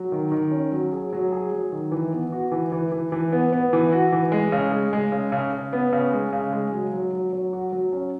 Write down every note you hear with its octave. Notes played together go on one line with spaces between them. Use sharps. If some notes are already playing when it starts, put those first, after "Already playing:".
Already playing: F#3
D#3
D#3
C#4
F#3
G#4
F#3
G#4
F#3
D#3
E3
B3
F#4
E3
E3
E3
E3
B3
B3
E3
F#4
E3
G#3
C#3
G#3
G#3
C#3
C#3
C#3
B3
C#3
G#3
C#3
G#3
F#3
F#3
F#3
F#3
F#4
F#3
C#4